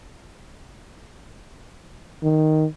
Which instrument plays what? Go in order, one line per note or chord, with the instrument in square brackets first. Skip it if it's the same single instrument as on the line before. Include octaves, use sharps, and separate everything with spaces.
[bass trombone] D#3